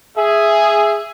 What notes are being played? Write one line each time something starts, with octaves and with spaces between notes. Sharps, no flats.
G#4 E5